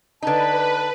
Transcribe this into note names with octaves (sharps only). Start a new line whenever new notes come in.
D3 D#4 B4 A5